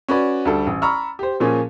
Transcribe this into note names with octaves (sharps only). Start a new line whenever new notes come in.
C#4 F#4 B4 D5
D2 G3 A4
A1
A#5 B5 C#6 E6 F6
G4 C5
A#2 F3 A#3 C#4 G#4